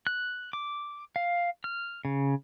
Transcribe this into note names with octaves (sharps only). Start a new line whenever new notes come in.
F#6
D6
F5
F6
C#3